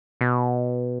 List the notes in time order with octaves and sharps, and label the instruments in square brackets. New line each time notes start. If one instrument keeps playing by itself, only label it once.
[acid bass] B2